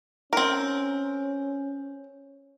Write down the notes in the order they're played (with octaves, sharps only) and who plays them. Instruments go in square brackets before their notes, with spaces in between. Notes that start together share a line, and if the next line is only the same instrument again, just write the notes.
[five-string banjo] C4 A#4 [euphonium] C#4